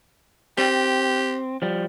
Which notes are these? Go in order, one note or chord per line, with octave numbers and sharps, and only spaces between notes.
C4 G4
F3 G3